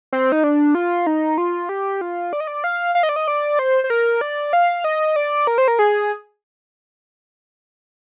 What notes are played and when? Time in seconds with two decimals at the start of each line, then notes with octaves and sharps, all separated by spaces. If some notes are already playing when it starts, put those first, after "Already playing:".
0.13 C4
0.32 D#4
0.44 D4
0.75 F4
1.07 D#4
1.38 F4
1.69 G4
2.01 F4
2.33 D5
2.40 D#5
2.47 D5
2.64 F5
2.95 F5
3.03 D#5
3.09 D5
3.16 D#5
3.28 D5
3.59 C5
3.84 C5
3.90 A#4
4.21 D5
4.53 F5
4.84 D#5
5.16 D5
5.47 A#4
5.58 C5
5.68 A#4
5.79 G#4